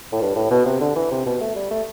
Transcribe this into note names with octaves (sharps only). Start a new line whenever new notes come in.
A2
G2
A2
B2
C3
D3
E3
C3
B2
A3
G3
A3